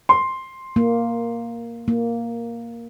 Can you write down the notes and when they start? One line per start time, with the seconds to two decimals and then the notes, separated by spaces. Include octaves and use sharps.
0.09 C6
0.76 A#3
1.88 A#3